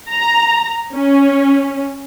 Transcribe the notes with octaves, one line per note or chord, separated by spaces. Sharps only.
A#5
C#4